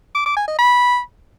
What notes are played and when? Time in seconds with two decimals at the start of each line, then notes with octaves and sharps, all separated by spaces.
0.15 D6
0.26 D6
0.37 G#5
0.48 D#5
0.59 B5